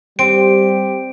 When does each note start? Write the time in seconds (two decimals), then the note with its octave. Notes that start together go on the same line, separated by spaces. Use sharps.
0.19 G3 C4 G4 D7